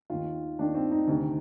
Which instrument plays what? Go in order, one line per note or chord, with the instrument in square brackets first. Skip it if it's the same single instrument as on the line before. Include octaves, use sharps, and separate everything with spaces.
[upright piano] D#2 D#3 F4
D#2 D#3 D4
C4
D#4
D2 C3 D#3